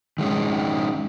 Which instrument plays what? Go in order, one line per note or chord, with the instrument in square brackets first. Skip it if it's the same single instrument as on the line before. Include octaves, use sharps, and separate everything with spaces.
[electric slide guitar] D#3 G#3 C#4 D#4